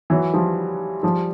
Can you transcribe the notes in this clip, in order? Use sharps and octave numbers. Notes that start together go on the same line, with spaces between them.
E3 F#3
F3 G3
F3 G3